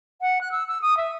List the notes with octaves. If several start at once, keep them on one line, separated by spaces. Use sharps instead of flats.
F#5
F#6
E6
E6
D#6
E5